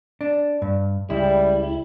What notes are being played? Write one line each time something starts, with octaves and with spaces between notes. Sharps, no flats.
D4
G2
C#2 G3 E4